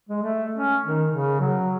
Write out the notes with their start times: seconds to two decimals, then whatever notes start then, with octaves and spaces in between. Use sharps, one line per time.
0.09 G#3
0.23 A3
0.56 C#4
0.86 D#3
1.10 C#3
1.41 F#3